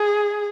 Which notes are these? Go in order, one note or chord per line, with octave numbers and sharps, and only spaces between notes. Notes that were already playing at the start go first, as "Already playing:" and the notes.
Already playing: G#4